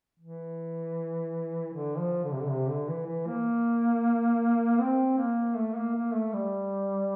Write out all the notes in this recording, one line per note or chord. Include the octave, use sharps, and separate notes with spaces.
E3
D3
F3
D3
C3
D3
C3
D3
E3
E3
A#3
C4
A#3
A3
A#3
A#3
A3
G3